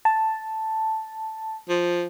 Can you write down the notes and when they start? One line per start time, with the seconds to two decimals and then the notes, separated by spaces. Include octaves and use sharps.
0.05 A5
1.69 F3